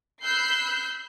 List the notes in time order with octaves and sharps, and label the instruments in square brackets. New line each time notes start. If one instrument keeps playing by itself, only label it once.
[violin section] B5 E6 F#6 G6 C7